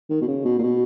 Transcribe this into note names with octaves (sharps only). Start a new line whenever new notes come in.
D#3
B2
C#3
B2
A#2
B2